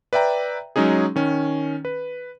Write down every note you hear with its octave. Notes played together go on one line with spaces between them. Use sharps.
B4 D5 E5 G5 A#5
F#3 G#3 C#4 D#4 G#4
D#3 C#4
B4